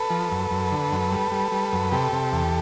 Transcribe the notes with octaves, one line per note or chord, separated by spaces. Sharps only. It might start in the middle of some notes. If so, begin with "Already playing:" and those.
Already playing: A4 B4
F3
F#2
F#2
D3
F#2
G3
G3
G3
F#2
C3 G4 A4
C3
E2